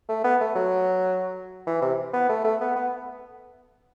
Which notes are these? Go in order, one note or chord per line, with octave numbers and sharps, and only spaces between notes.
A3
B3
A3
F#3
E3
C3
B3
A3
A3
B3
B3